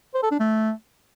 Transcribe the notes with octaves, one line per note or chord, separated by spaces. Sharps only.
C5
A4
D4
A3